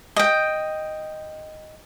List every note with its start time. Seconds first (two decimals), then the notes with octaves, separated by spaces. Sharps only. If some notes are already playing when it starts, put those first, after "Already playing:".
0.16 D#5 G5